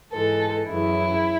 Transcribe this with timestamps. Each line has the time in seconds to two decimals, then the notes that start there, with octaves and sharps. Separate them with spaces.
0.13 G#2 E3 G#3 A4
0.68 F#2 C#3 E3 E4